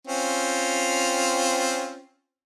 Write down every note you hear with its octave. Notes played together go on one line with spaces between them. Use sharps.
C4 C#4 F4